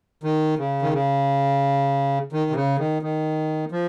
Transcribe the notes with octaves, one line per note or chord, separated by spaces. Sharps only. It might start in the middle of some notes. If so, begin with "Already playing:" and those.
D#3
C#3
D#3
C#3
D#3
C3
C#3
D#3
D#3
F3